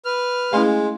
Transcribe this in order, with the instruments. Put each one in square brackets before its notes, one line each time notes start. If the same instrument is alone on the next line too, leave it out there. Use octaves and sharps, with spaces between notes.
[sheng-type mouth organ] B4 F6
[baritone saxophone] G#3 [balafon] A3 C#4 E4 [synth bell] F5 G#5 C6